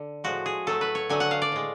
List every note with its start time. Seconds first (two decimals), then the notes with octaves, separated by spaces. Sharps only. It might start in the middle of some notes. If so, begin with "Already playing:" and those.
Already playing: D3
0.24 A2 F3 G#3 F#4
0.46 G#4
0.67 A2 F#3 A3 A4
0.81 B4
0.95 C#5
1.10 D3 F#3 A3 G#5
1.20 F#5
1.31 F5
1.42 D5
1.52 A2 G#3